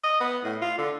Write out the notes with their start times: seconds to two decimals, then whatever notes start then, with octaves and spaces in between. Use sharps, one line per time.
0.04 D#5
0.21 B3
0.44 A2
0.62 F4
0.78 D3